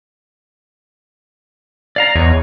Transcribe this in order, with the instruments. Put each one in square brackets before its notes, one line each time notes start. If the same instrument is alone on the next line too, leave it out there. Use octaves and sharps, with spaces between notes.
[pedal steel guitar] D5 F5 A#5
[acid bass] E2 [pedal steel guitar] C#5 D#5